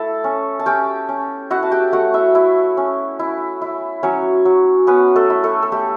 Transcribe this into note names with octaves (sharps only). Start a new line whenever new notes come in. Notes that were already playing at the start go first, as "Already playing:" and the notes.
Already playing: A3 E4 A4 A5
C#4
A5
C#4 G4 G5
C#4
E4 F#4 F#5
A5
G4 G5
A3 F#4 F#5
E4 E5
E4
C#4
E4
E4
F#3 C#4 C#5
F#3
B3 C#4 B4
A3 A4
E4
A3 A4
A4
A3 G4